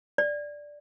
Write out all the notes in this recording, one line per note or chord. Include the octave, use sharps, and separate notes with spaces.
D5